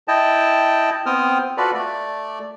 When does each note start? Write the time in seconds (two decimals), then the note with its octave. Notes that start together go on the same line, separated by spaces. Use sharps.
0.08 E4 D#5 G5 A5
1.06 B3 C4 C5 G5 D#6 F6
1.57 F4 F#4 A4 B4 D5
1.74 A3 D5